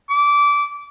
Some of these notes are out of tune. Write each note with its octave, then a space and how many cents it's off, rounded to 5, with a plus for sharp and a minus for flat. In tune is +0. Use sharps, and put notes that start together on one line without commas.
D6 -20